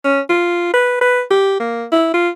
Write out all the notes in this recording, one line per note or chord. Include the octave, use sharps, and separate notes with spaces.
C#4
F4
B4
B4
G4
A#3
E4
F4